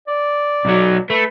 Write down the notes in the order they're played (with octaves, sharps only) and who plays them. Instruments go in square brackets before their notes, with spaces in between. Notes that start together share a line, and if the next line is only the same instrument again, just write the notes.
[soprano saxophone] D5
[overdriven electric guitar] B1 F#3
[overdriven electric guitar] A3 [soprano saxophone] B4